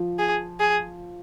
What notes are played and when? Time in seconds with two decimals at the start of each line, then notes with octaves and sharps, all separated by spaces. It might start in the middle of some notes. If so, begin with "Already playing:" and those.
Already playing: F3
0.19 G#4
0.60 G#4